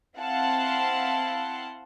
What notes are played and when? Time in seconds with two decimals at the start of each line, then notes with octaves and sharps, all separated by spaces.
0.18 C4 E4 F5 F#5 A5 C6